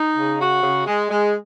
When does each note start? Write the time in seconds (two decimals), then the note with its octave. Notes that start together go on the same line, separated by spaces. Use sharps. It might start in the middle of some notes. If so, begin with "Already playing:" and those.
Already playing: D#4
0.16 C#3
0.40 F#4
0.63 C#3
0.87 G#3
1.10 G#3